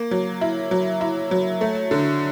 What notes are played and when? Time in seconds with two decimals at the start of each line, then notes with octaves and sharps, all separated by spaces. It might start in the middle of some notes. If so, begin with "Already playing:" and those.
Already playing: A#3
0.11 F#3
0.41 E4
0.71 F#3
1.01 E4
1.31 F#3
1.61 A3
1.91 D3